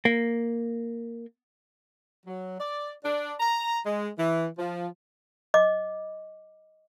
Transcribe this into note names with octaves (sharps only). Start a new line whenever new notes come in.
A#3
F#3
D5
D4
A#5
G#3
E3
F3
D#5 D6